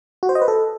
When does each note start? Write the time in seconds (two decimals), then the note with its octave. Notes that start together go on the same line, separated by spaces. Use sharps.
0.23 F#4
0.29 C5
0.35 D#5
0.42 B4
0.48 A4